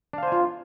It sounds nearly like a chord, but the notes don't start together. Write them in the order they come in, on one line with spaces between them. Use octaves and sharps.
D4 F5 C5 G#5 F4